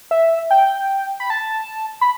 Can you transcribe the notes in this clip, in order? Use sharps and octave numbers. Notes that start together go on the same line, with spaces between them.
E5
G5
B5
A5
B5